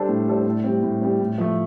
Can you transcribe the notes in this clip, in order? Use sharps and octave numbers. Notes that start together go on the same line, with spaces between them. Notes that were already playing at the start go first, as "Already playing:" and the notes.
Already playing: G3 D4 A4 C5
A2
G3 D4 A4 C5
A2
G3 C4
A2
G3 C4
A2
F3 A3